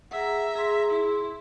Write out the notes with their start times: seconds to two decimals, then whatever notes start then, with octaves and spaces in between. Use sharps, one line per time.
0.11 G#4 E5 F#5 A#5
0.55 G#4 C6
0.90 E4